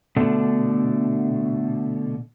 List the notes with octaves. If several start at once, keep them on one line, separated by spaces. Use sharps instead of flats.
B2 D3 A3 D4